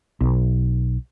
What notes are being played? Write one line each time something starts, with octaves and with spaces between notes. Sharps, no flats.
B1